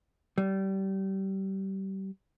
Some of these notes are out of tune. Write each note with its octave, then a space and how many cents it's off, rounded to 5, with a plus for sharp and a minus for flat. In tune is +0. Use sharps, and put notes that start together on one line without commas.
G3 -25